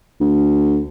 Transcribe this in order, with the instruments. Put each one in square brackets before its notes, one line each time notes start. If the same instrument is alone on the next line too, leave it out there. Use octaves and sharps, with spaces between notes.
[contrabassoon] D2